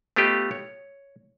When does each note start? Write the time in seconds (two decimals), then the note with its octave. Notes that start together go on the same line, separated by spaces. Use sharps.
0.16 A3 B3 F4 G4 D#5
0.51 C#5